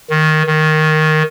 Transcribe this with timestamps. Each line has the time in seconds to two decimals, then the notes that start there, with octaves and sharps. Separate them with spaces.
0.10 D#3
0.47 D#3